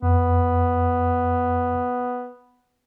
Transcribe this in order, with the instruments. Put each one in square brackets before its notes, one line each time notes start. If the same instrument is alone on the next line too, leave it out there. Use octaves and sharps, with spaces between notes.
[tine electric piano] F2 [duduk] B3